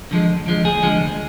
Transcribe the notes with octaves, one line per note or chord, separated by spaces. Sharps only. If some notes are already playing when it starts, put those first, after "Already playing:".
D3 F3 G#3
D2
D3 F3 G#3
D2 G#4
D3 F3 G#3
D2